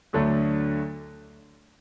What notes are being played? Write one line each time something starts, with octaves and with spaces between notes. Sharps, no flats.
D2 D3 F#3 A3 D4